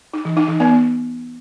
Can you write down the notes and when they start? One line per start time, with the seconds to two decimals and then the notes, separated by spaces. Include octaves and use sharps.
0.14 D#4
0.25 E3
0.37 D#4
0.48 E3
0.60 B3